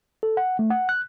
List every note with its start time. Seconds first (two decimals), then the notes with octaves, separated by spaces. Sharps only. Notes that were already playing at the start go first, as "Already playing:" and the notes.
0.23 A4
0.37 F#5
0.59 A3
0.70 F#5
0.89 F#6